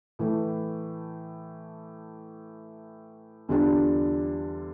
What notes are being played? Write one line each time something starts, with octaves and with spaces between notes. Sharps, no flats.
A2 E3 A3
E2 D3 G3 D4 F4